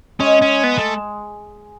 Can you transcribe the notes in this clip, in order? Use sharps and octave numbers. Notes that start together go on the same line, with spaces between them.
G#3 C#4
C#4
B3
A3